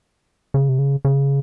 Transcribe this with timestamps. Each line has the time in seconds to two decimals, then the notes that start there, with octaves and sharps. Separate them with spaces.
0.54 C#3
0.69 C3
0.79 C#3
1.05 C#3